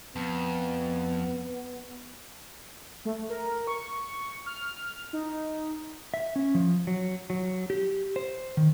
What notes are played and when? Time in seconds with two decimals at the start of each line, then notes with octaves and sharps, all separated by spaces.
0.16 F2 B3
3.05 A3
3.30 A#4
3.67 C#6
4.46 F6
5.13 D#4
6.14 E5
6.36 C#4
6.55 F3
6.87 F#3
7.30 F#3
7.70 G4
8.16 C5
8.57 D#3